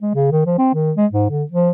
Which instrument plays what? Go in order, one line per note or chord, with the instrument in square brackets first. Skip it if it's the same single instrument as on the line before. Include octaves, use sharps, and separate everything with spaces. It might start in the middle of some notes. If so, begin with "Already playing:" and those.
[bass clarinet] G#3
C#3
D#3
F3
C4
D#3
G#3
G#2
D3
F3